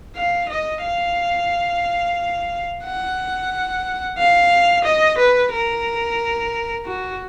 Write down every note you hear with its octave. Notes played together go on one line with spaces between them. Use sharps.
F5
D#5
F5
F#5
F5
D#5
B4
A#4
F#4